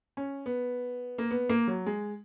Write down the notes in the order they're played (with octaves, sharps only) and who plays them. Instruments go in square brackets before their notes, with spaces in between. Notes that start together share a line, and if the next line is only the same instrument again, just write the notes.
[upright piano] C#4
B3
A#3
B3
A#3
F#3
G#3